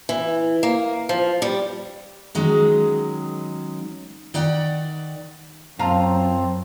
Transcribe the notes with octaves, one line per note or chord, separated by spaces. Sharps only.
E3
A#3
F3
G3
D#3 F#3 G#3 C#4
D#3 D5 F#5 G5
F#2 C4 F4 A5 A#5